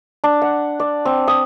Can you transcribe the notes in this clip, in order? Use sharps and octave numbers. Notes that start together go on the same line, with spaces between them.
D4
F#5
D5
C4
D#6